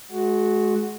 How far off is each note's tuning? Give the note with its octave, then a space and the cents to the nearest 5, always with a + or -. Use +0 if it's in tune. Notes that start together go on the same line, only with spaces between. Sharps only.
G#3 +35 F#4 +0